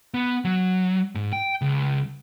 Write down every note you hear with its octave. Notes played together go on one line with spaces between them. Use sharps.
B3
F#3
G#2
G5
C#2